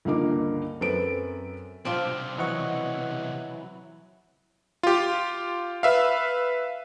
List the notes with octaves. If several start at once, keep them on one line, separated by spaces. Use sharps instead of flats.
C#2 G2 D3 A#3 D#4 D6
F#2 C4 A4 B4 D7
B1 C3 C4 D4 F4
E3 F#3 D#5 F#5 C#6
F4 G4
B4 E5 F5